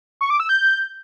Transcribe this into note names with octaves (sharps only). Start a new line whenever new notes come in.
C#6
D6
E6
G6